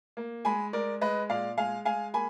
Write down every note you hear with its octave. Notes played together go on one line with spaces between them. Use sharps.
A#3
G#3 G#5 B5
G#3 A#4 D5
G#3 B4 D#5
A#2 D5 F5
G#3 F5 G#5
G#3 F5 G#5
A#3 G#5 B5